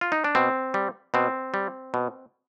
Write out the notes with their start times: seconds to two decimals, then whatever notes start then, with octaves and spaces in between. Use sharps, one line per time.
0.01 F4
0.12 D#4
0.24 D4
0.35 B2 C4
0.74 G3
1.14 B2 C4
1.54 G3
1.94 B2